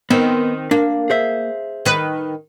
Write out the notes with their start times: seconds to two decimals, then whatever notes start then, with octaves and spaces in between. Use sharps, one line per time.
0.10 D#3 B3 C4
0.71 A#3 D4
1.10 G#4 C5 E5
1.85 D#3 B4